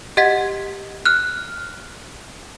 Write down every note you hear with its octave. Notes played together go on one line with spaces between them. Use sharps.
G4 D#5 F#5 G#6 B6
F6 F#6